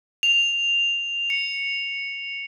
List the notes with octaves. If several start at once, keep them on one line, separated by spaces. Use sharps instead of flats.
F7
C#7